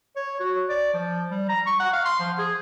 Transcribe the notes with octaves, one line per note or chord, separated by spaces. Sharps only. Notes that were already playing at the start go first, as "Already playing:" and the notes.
C#5
F#4
D5
F3
G3
A#5
C#6
F#5
F5
C6
F3
G#4